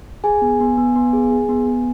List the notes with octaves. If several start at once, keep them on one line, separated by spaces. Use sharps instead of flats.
G#4 G#5
B3
B3
B3
B3
G#4
G#4
B3
B3